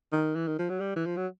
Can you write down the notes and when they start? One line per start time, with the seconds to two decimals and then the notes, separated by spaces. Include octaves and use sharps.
0.12 D#3
0.35 E3
0.47 D#3
0.59 F3
0.69 F#3
0.80 G3
0.96 E3
1.06 F3
1.16 F#3